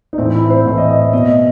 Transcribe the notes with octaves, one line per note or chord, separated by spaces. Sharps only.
D#4
A2 E3 C4
E4
C5
A2 E3 E5
D#5
D#5
D#5
B2 D#5
D#5